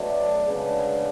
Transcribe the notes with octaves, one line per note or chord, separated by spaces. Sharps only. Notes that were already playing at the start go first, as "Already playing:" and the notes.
Already playing: B2 F#3 A3 D4
D2 C#3 G#3 B3 D4